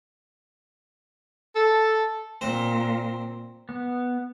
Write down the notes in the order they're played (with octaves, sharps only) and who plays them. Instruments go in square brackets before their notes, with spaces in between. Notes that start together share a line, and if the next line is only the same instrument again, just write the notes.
[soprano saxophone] A4
[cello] A#2 [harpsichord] C4 C5
[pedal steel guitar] B3